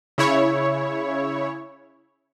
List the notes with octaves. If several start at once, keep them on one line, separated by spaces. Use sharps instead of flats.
C#3 E4 C#5